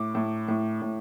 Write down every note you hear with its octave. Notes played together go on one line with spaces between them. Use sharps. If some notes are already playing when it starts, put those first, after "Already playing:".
Already playing: A2 D6
A2
A2
A2